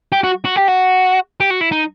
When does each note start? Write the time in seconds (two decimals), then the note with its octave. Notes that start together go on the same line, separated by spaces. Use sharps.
0.12 G4
0.23 F#4
0.44 F#4
0.56 G4
0.68 F#4
1.40 G4
1.50 F#4
1.61 E4
1.72 D#4